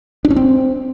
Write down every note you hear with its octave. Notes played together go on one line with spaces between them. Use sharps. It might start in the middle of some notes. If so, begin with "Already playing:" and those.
D4
C#4
C4